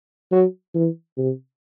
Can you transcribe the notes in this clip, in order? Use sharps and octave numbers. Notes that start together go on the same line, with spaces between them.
F#3
E3
C3